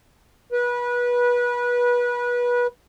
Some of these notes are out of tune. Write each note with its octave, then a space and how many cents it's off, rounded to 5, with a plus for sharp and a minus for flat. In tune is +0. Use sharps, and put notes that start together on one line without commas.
B4 -25